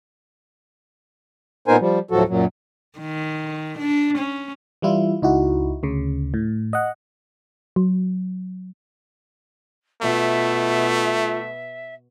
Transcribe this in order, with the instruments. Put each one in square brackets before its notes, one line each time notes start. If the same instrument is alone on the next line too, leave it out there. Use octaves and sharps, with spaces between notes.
[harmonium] A#2 B3 D#4 A#4 C5 G#5
F3 G3
D2 A2 F3 F#3 F#4 A4
F#2 A#2 F#3
[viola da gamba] D#3
D4
C#4
[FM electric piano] E3 G3 E4 F4
C#2 D#4 E4 F#4
D2 C#3
A2
D#5 F#5
[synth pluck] F#3
[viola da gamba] B2 [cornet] A3 [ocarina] F4 [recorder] E5